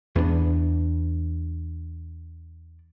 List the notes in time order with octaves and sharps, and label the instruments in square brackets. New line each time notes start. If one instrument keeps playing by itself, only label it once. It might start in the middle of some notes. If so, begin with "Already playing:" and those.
[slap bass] E2 B3 C#4 D4